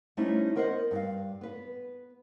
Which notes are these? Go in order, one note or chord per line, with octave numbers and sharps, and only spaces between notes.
G3 A3 C#4 D#4 E4 C5
B3 A#4 C5 D#5 E5 F#5
G2 F5
B3 B4